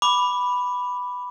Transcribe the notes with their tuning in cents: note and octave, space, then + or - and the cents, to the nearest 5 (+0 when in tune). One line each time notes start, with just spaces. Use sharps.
B5 +0 D6 +0